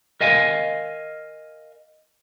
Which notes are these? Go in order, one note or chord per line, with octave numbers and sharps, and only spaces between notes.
A#4 D#5 F5 G#5